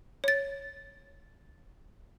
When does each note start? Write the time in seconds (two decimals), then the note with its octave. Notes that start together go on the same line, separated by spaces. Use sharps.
0.24 C#5 A6